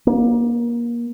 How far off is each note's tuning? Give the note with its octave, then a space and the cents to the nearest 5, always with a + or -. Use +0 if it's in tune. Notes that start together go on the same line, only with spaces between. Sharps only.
A#3 +25